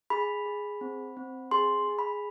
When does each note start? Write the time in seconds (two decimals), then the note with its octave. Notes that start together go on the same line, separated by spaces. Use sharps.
0.10 G#4 B5
0.46 G#4
0.81 C4
1.17 C4
1.51 G#4 C6
1.87 G#4
1.99 B5